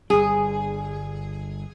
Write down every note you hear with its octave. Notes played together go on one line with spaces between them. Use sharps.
G1 G3 G#4